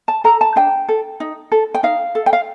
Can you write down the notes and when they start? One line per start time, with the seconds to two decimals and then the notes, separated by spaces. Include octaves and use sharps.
0.08 A5
0.24 A4 A#5
0.41 A5
0.56 D4 G5
0.89 A4
1.20 D#4
1.52 A4
1.74 G5
1.83 D#4 F5
2.15 A4
2.26 G5
2.33 F5